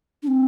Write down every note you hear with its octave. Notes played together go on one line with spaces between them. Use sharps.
D4
C4